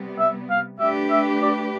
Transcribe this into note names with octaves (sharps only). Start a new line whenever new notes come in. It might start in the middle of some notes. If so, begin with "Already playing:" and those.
Already playing: C3 G3 B3
E5
F5
A3 D4 G4 B4 E5
E5
D5